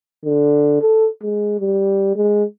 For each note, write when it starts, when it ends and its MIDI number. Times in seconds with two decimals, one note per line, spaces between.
0.25 0.81 50
0.81 1.07 69
1.22 1.58 56
1.59 2.12 55
2.16 2.44 56